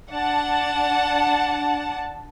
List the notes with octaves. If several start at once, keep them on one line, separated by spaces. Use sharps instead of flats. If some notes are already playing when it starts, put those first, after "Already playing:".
D4 F#5 A5